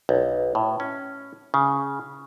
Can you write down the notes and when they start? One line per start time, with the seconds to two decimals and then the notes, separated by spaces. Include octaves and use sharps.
0.09 B1
0.55 A2
0.80 C#4
1.54 C#3